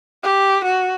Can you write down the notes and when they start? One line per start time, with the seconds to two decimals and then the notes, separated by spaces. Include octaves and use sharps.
0.23 G4
0.64 F#4